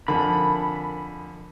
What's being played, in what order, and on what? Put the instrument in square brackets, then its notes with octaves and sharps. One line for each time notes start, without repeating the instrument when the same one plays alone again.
[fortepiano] F2 D3 [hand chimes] A#4 G#5 A5 [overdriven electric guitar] B5